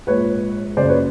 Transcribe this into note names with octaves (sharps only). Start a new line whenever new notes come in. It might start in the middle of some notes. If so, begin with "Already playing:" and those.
A#1 G#2 F3 B4 C#5
F#1 F#2 C#3 C5 D5
B4 C#5